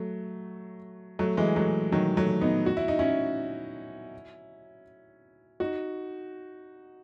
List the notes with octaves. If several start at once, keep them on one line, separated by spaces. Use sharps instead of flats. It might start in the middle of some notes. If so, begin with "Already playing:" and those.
Already playing: F#3 A3
F#3 A3
E3 G#3
F#3 A3
D#3 F#3
F#3 A3
B3 D#4
F#4
E4
D#4
C#4 E4
D#4 F#4